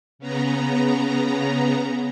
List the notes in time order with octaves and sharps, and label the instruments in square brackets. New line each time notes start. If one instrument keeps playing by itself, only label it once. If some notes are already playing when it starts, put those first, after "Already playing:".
[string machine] C#3 B3 A#5